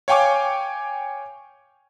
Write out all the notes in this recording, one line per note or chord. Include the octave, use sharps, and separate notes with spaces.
C#5 F5 G5 G#5 C#6 D6